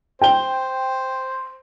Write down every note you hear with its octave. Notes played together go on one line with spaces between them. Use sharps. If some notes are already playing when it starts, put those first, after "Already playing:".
C5 G5 G7